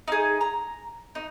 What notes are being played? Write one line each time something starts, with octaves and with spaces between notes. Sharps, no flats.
D#4 G#4
A#5
D#4